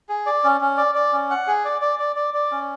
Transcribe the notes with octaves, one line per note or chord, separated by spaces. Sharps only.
G#4
D5
C#4
C#4
D5
D5
C#4
F#5
G#4
D5
D5
D5
D5
D5
C#4